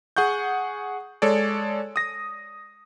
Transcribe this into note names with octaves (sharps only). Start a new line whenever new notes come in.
G#4 F#5 C#6 G6
G#3 A4 C#5 D5
D#6 A#6